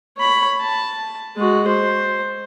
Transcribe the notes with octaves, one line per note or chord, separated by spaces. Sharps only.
C#5 B5
A5
G#3 F#4
C5